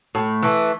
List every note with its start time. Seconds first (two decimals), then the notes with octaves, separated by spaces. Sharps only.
0.15 A2
0.43 E3 A3